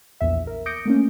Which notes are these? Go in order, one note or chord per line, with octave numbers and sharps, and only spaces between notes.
A#1 E2 E5
A#4
D6 D#6 G6 A#6 C#7 D7
A3 A#3 C#4